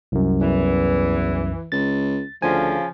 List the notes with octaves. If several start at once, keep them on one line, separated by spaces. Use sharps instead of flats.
C2 F#2
E2 E3
C#2 A6
D2 C#3 F3 G#5